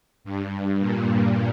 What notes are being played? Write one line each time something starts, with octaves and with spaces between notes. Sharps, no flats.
G2
A#2